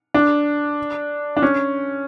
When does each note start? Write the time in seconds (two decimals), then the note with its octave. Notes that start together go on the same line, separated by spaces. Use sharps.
0.14 D4
1.37 D4
1.42 C#4